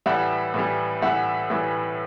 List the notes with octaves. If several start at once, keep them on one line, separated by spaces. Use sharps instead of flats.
A2 E3 G3 E5 F#5
A2 E3 G3
A2 E3 G3 E5 F#5
A2 E3 G3